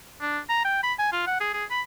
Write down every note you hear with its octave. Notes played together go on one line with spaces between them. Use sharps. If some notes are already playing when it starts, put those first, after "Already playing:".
D4
A#5
G5
B5
G#5
F4
F#5
G#4
G#4
B5